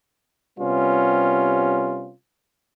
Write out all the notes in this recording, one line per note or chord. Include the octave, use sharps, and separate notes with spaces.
C3 G3 B3 C#4 F4